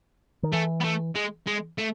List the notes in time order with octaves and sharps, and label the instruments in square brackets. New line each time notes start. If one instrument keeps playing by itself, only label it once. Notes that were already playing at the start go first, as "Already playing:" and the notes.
[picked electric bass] D#3
[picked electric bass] E3 [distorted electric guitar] A3
[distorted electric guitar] B3
A3
G#3
G#3
A3